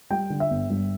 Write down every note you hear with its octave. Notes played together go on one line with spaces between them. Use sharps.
G3 G5
D3
E5
G1
G2